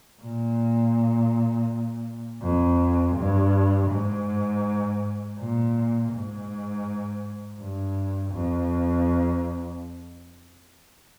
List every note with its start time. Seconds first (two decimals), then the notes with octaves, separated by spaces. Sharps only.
0.21 A#2
2.43 F2
3.16 G2
3.91 G#2
5.38 A#2
6.12 G#2
7.60 G2
8.34 F2